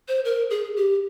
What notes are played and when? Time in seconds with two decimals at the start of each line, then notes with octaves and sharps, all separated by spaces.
0.08 C5
0.25 A#4
0.50 G#4
0.77 G4